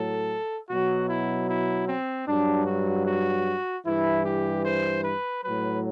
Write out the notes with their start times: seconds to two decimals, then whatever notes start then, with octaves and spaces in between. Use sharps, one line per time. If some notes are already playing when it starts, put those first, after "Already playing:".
Already playing: A2 F#3 A4
0.69 B2 F#3 F#4
1.09 E4
1.49 E4
1.89 C4
2.27 G2 F#3 D4
2.66 F#4
3.07 F#4
3.85 G2 E3 E4
4.25 G4
4.65 C5
5.04 B4
5.44 A2 F#3 B4